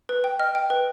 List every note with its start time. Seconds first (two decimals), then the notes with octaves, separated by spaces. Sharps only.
0.09 B4
0.24 G5
0.39 D#5 F6
0.55 G5
0.70 B4